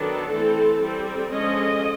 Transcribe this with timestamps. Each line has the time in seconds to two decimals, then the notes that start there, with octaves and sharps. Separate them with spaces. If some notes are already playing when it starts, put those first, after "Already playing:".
Already playing: D#3 F#3 B3 D4 A4
0.33 E3 A3 C4
0.82 G3 C4
1.31 D3 F3 G#3 C#4 D#5